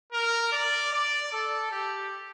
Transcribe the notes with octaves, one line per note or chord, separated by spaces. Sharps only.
A#4
D5
D5
A4
G4